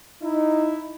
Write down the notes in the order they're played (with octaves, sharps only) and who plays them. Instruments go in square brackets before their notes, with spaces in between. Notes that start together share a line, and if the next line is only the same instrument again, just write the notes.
[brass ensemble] D#4 E4